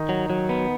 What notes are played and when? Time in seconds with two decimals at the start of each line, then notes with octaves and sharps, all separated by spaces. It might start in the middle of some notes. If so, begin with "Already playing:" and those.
Already playing: D#3 D#4
0.09 F#3
0.30 F#3
0.49 B3